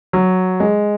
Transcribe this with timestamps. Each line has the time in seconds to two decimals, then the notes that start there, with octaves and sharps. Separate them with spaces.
0.13 F#3
0.60 G#3